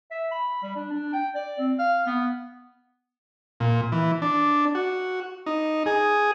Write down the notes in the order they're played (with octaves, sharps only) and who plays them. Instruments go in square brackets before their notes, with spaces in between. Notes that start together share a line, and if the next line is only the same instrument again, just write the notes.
[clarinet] E5
B5
G3
D4
D4
G5
D5
C4
F5
B3
[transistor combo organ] A#2
E3
D4
F#4
D#4
G#4